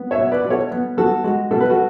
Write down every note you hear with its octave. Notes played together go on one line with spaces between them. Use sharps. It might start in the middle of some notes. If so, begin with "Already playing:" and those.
Already playing: B3
C#5 E5
B2
B4 D5
B2
A4 C#5
B3
B3 F#4 A4
G#3 F#4
B2 A4
B4
F#4 A4